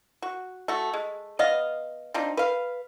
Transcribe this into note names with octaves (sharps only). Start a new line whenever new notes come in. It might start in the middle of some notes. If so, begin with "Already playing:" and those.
F#4
A3 F#4
G#3
B3 D#5 F5
C4 D4 D#4 F4
B4 F5